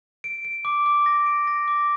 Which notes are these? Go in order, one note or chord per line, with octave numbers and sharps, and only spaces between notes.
D7
D7
D6
D6
A#6
D7
A#6
D6